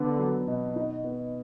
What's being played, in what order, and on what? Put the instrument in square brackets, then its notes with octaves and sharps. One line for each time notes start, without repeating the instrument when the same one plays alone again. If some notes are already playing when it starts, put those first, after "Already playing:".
Already playing: [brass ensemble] D3 [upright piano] B3 D4
[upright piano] F#3
B2
D#4
B3